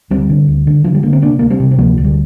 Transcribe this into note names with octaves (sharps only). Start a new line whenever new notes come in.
D2 G3 C4
D3
D2
D3
D3 F3
G3
D3 A#3
C4
C3 A#3 D4
D2 A#3
G3 C4
C3
C4
D2 F3 A#3
D2
G3